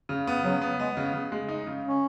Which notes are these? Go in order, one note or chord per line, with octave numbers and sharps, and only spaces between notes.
C#3
B3
C#3 F#3
B3
G#3 B3
C#3
C#3
G#3
D#4
C#3
C#4